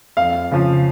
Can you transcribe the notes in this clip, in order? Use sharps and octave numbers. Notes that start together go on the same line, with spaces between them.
F2 F5
C#3 F3